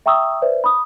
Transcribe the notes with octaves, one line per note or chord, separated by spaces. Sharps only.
E5 G5 A#5 C#6 D#6 E6
B4 C5 D5 E5
B5 D#6